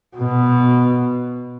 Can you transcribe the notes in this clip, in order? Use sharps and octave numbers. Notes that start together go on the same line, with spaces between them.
B2